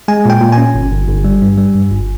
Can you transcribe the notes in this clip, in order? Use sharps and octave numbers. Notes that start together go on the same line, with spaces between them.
G#3 G#5
A#2 G5
A#2
G#5
C#4
G1
G1
G1
G3
G2
G3
G2
G1